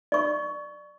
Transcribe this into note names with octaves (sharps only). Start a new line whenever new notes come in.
D5 C#6